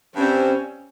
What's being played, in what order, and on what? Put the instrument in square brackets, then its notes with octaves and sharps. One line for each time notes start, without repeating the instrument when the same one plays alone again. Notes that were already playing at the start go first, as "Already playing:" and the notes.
[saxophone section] G2 G3 C4 G4 [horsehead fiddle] C#4